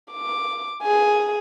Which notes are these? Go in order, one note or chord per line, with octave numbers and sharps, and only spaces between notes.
D6
G#4 G#5